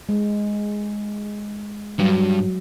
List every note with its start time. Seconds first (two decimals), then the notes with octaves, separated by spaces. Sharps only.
0.09 G#3
1.99 G2 F#3